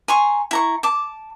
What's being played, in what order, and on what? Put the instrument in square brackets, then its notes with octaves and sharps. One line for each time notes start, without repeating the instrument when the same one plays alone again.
[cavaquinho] G#5 A#5 C6 C#6
E4 A#5 C#6
A5 D6